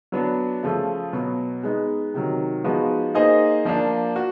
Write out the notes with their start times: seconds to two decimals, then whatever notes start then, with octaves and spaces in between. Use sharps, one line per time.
0.12 F#3 B3 D4
0.63 C#3 F3 A3
1.13 B2 F#3 B3
1.63 G#3 B3 D#4
2.14 C3 D#3 F#3
2.64 F3 G#3 B3 D#4 F#4
3.15 A#3 D#4 G#4 C5 D#5
3.65 F3 A#3 D4
4.16 F#4